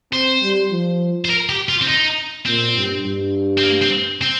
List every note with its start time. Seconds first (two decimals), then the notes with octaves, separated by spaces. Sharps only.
0.12 C4 C5
0.42 G3
0.71 F3
1.25 C5
1.30 A#4
1.49 G4
1.69 F4
1.82 C4
1.88 D#4
2.46 A#2 C4
2.76 G2
3.05 G2
3.58 C4
3.63 A#3
3.82 C4
4.21 C4